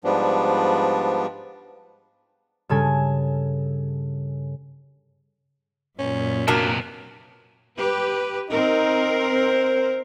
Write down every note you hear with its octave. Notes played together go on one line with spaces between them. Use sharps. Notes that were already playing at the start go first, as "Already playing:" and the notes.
G#2 F3 G3 B3 D4
G2 C#3 A4 G#5
F#2 A#2 C#4
C3 F#3 A#3 B3 D4 A#4
G4 B4
C4 D#4 A#4
C5